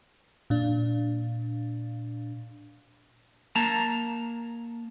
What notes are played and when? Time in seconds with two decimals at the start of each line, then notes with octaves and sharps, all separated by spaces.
0.50 A#2 D4
3.56 A#3 A5 A#5